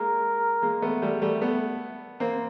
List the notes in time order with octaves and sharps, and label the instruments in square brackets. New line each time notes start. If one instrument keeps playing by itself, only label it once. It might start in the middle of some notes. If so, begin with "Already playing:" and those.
Already playing: [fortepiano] G#3 A#3 [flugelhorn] A#4
[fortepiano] G#3 A#3
A3 B3
G3 A3
G3 A3
A3 B3
A#3 C4